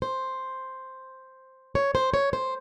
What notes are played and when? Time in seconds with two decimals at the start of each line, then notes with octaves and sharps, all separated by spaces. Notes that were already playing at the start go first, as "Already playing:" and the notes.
0.02 C5
1.75 C#5
1.95 C5
2.14 C#5
2.33 C5